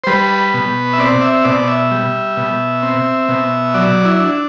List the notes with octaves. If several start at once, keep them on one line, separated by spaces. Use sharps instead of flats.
C5
G3 B4
B2
E5
C4 D5
E5
B2 D5
E5
G3
B2
C4
B2
F#3 D5
E4
D4